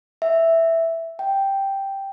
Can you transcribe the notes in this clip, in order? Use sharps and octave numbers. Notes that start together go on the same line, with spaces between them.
E5
G5